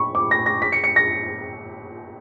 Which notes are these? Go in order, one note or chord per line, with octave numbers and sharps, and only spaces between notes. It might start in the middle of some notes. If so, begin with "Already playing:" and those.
Already playing: B5 C#6
D6
A#6
A#6
B6
C#7
C#7
A#6